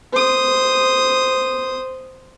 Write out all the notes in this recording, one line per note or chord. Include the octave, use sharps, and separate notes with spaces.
C5 D#6